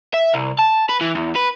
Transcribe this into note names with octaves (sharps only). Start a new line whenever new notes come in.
E5
C2
A5
B4
E3
E2
B4